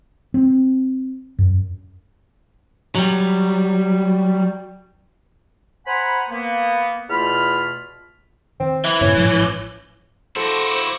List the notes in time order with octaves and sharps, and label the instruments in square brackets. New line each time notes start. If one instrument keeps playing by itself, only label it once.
[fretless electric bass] C4
F#2
[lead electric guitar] F#3 G3
[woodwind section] C5 F#5 G#5 A#5 B5
A#3 B3
E2 B2 A3 F4 B5 F6
[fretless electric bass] D#3 [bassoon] C4
[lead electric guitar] E3 [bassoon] E4
[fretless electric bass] G2 A#2 C#3 [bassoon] C#4
[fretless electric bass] A1 G#2 F3
[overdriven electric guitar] E4 F#4 [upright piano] A4 [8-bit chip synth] C5 [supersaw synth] C#6 D6 A#6